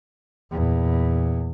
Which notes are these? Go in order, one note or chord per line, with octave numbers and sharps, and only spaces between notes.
E2 A#2